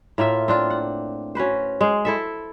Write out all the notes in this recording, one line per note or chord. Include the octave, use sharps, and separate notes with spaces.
A2 A#3 F4 E5
C4 D4 F4
F#5
C#4 F#4 B4 C5
G#3 C5
E4 A4 E5